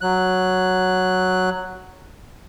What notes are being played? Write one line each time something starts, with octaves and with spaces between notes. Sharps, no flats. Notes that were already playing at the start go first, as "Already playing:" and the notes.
F#3 F#6